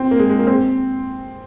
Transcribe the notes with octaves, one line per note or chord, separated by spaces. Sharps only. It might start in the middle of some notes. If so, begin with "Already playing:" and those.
Already playing: C4
A#3
G#3
G#3
A#3
C4